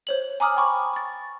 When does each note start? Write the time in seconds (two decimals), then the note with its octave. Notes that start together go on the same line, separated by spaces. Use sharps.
0.07 C5 C#5 F#7
0.40 G#5 A#5 D6 D#6 F6
0.56 G5 B5 C#6 D6
0.93 C#6 A6